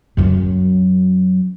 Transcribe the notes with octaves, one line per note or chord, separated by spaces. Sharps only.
F#2 F#3